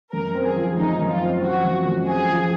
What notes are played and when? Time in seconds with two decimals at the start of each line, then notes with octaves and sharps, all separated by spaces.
0.12 F#2 A#4
0.35 C4
0.45 G#4
0.55 F3
0.77 F#2 D#4
0.99 F#2
1.09 F4
1.20 C4
1.41 F3 F#4
1.64 F#2
1.85 F#2
2.07 C4 G#4
2.29 F3